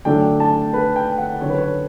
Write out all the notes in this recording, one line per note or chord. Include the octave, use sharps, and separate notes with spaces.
D3 F#3 A3 D4 G5
A5
B4
G5
F#5
D3 F#3 C#4 C#5
B4
C#5